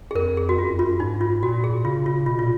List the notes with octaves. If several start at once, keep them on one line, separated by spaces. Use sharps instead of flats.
G#4
F2 A#4
G#4
F#4
F#2 F4
F4
G#2 D#4
F4
A#2 F#4
G#4
C#3 F4
F4
B2 F4
A#2 F4